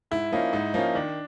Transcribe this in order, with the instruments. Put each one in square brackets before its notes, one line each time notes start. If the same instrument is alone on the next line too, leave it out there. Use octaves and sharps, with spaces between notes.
[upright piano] G#2 [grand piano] E4
[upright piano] F3 A#3 C#4 F4 [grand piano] D#4
[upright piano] G#2 [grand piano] D#4
[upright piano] F3 A#3 C#4 F4 [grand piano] D#4
[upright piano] D#3 [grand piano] D4